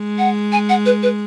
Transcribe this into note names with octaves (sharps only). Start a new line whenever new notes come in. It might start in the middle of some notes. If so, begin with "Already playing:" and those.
Already playing: G#3
F#5
G#5
F#5
B4
B4